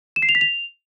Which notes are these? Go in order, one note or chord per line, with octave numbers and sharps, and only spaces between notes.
E7
C7
F7
B6
F7